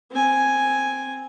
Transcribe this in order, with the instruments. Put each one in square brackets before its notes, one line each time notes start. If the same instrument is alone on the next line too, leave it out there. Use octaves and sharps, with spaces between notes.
[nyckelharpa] C4 G#5